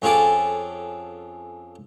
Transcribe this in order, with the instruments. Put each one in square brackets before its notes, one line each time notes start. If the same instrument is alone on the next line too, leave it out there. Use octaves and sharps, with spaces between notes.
[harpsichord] F2 C#4 F4 G#4 A4 D6